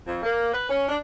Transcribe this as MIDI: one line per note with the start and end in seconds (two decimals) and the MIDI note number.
0.07 0.20 41
0.23 0.52 58
0.54 0.65 71
0.70 0.86 61
0.88 0.98 62